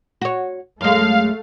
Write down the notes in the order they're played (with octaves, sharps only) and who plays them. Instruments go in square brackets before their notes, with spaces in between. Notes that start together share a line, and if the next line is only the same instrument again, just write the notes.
[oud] F#4 C#5
[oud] F#2 G#3 [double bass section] A3 [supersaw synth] F5